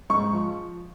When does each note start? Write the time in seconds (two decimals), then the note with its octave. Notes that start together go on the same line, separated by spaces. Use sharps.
0.10 G#2 C#6
0.33 F3